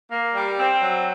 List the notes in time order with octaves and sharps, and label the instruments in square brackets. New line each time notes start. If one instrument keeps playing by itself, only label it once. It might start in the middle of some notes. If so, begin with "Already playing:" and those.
[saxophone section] A#3
G3
C4
F#3